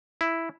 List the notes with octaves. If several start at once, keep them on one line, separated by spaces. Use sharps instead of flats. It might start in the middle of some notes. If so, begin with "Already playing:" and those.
E4